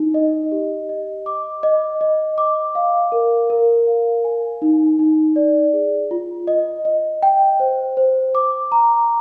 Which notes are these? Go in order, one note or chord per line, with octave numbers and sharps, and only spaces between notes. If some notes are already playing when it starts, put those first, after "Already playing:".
Already playing: D#4
D#5
G4
D#5
D6
D#5
D#5
D6
F5
A#4
A#4
F5
G#5
D#4
D#4
D5
G#4
F4
D#5
D#5
G5
C5
C5
D6
A#5